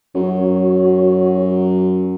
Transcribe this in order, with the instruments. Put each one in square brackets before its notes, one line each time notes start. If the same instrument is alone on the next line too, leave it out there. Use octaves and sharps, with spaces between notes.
[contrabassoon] F#2 [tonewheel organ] F#4 C#5